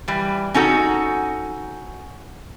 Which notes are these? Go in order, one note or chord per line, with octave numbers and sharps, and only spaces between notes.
E3 G3
C#4 D#4 F#4 A4